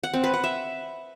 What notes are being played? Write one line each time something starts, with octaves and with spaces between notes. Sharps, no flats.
F#5
C4
B4
F#5
E5